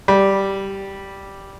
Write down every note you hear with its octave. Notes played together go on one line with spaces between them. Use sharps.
G3